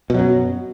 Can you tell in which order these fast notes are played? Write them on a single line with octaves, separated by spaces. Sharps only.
B2 F#3 F#2